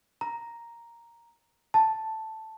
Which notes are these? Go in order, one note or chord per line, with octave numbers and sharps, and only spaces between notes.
A#5
A5